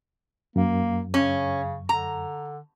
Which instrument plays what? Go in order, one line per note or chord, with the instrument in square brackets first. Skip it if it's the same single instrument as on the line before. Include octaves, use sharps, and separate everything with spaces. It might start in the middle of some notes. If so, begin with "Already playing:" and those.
[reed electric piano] F#2 [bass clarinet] A#3
[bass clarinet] C#3 [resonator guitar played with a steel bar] C#4
[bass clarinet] D3 [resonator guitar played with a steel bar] A#5